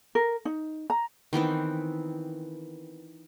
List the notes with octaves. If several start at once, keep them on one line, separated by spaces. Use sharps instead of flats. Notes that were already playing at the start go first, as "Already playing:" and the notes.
A#4
D#4
A#5
D#3 E3 B3 C4